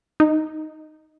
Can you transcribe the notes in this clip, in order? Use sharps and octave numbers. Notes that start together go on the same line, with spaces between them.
D#4